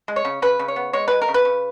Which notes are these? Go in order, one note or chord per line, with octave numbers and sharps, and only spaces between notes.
G#3
C#5
C#3
C#3 B4
C#3
C#5
B3
G#3 C#5
G#3 B4
A#4
C#3
B4
C#3